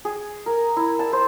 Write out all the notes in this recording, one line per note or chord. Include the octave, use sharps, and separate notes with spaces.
G#4
A#4
E4
A5
C5